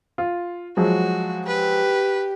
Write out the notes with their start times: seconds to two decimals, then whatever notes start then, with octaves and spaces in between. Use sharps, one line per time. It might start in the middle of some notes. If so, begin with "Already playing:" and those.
0.18 F4
0.77 F3 F#3 G#3 F#4
1.47 G4 B4